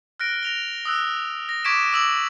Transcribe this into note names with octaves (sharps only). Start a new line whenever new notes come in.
F6 F#6 A#6 D7
A#6 F7 G7
D#6 E6 F#6
A#6
C#6 D6 G#6 B6 D7 E7
D6 E6 F#7